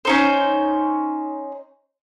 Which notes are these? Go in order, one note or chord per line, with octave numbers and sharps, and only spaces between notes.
C#4 D#4 C5